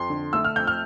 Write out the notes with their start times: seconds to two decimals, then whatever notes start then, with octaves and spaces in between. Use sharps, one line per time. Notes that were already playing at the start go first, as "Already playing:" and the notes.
Already playing: F2 C6
0.10 D3
0.33 A3 E6
0.44 F6
0.56 F2 G6
0.67 F6